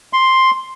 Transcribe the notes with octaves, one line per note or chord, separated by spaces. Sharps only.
C6